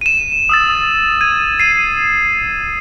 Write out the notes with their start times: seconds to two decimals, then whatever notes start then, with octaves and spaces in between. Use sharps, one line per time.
0.01 D#7 E7
0.49 D#6 E6 A6
1.21 G#6 D#7
1.60 C7 D#7